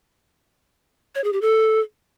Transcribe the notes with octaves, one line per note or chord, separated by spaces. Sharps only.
C#5
G#4
G4
A4